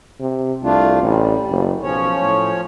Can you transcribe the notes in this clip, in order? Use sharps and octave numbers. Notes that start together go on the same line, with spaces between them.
C3
C2 A3 D4 F4
A1 G3
F#1
B1 F3 C#4 C#5
A2